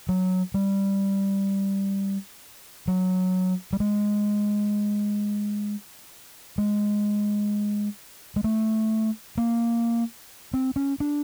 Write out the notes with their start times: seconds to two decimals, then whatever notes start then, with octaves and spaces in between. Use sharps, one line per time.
0.09 F#3
0.54 G3
2.88 F#3
3.73 G3
3.80 G#3
6.58 G#3
8.36 G#3
8.44 A3
9.37 A#3
10.54 C4
10.76 C#4
11.00 D4